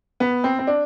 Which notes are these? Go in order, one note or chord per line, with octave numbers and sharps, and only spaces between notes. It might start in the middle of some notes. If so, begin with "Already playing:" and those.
B3
C4
C4
D4